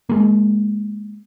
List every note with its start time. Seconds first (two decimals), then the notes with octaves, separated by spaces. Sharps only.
0.09 G#3 A#3